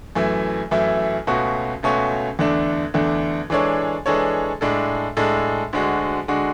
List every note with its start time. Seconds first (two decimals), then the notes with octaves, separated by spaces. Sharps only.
0.15 F#2 E3 A3 E4
0.71 F#2 E3 A3 E4
1.27 C#2 B2 A3 C#4 F#4
1.83 C#2 B2 A3 C#4 F#4
2.39 E2 D3 A3 D4
2.94 E2 D3 A3 D4
3.50 E3 G#3 D4 A4 C#5
4.06 E3 G#3 D4 A4 C#5
4.61 A2 G#3 D4 A4
5.17 A2 G#3 D4 A4
5.73 D2 D3 G#3 D4 F#4
6.28 D3 G#3 D4 F#4